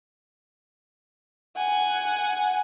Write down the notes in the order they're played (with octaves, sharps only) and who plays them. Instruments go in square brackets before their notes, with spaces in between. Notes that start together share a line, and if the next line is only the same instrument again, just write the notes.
[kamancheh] F#5 G#5